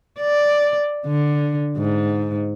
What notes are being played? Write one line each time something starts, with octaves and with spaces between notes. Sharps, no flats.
D5
D3
G#2